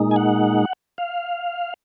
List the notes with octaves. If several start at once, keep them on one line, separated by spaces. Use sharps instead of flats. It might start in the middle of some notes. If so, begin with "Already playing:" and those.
Already playing: A#2 G#3 D#4
G#5
F#5
F5